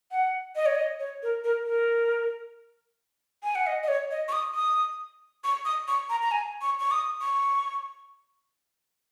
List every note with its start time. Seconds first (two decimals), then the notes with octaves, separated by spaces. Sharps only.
0.12 F#5
0.56 D#5
0.66 C#5
0.75 D#5
1.00 C#5
1.23 A#4
1.44 A#4
1.66 A#4
3.43 G#5
3.55 F#5
3.67 D#5
3.83 D#5
3.88 C#5
4.11 D#5
4.28 C#6
4.33 D#6
4.55 D#6
5.44 C#6
5.65 D#6
5.88 C#6
6.10 A#5
6.22 A#5
6.31 G#5
6.62 C#6
6.80 C#6
6.91 D#6
7.21 C#6